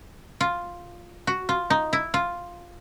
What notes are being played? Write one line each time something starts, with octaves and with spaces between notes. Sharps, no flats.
F4
F#4
F4
D#4
E4
F4